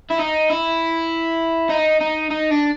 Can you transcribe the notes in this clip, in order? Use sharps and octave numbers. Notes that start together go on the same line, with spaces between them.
E4
D#4
E4
D#4
D#4
D#4
D4